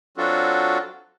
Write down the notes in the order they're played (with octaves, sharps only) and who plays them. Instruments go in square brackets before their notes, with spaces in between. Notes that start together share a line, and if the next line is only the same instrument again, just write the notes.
[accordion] F#3 C4 D4 F4 F#4 A4